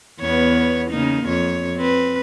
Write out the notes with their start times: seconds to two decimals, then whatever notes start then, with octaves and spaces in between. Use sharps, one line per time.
0.20 E2 B3 C#5
0.91 C#3 A#3 D#4
1.26 F2 C#5
1.77 C4 B4